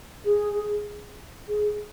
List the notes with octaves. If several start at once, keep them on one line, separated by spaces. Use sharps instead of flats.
G#4
G#4